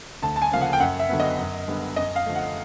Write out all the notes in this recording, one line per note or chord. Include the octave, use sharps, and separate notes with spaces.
D2 A5
A5
G#5
C#3 F3 A#3 C#4 F5
F#5
G5
F#2 F#5
E5
D3 F#3 B3
D#5
F#2
D3 G3 B3
F#2 D#5
F5
D3 F3 A3
F#5